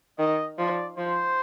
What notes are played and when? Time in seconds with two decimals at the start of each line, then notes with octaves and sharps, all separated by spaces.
0.19 D#3 D#5
0.58 F3 D5
0.97 F3 C5